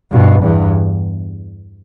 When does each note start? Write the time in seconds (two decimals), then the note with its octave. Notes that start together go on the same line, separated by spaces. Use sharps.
0.12 G2 B2
0.43 E2 G2